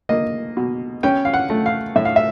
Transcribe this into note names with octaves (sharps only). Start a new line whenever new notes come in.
A#3 D#5
B2
C#4 G5
F5
F#5
A3
F5
A2 E5
F5
E5